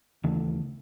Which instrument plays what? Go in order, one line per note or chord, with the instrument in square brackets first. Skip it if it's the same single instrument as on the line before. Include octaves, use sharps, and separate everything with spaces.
[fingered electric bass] D#2 C#3 E3 A3